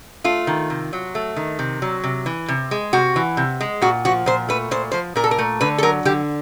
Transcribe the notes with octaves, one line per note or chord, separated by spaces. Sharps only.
A3 F4
D#3
C3
F#3
A3
D#3
C3
F#3
C3
E3
C3
G#3
C3 F#4
E3
C3
G#3
A#2 F#4
F3 F#4
A#2 C5
A3 B4
A#2 C5
F3 C5
A#2 A#4
A4
A#4
A3
D3 B4
A4
F#3 A#4
D3 G4